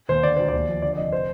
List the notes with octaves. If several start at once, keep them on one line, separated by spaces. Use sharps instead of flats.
D#2 C5
D3 D5
D2 C5
D#2 D5
F3
D3 D5
D5
F1 D#5
C5